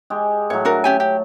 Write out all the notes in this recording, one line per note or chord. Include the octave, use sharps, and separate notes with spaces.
G#3 G4
A2 F#3 C#5
D4 F#4 A#4
C#4 G4 G#5
G4